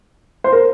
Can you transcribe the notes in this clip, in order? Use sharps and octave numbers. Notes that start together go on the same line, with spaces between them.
C5
A#4